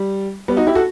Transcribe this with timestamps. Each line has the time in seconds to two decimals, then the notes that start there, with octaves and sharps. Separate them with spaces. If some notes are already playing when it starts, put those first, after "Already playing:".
Already playing: G3
0.48 G3 B3
0.57 D#4 F#4
0.67 E4 G4
0.75 F#4 A4